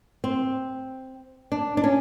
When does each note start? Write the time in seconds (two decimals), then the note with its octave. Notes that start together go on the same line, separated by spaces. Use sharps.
0.24 C4
1.52 D4
1.77 D4
1.84 C#4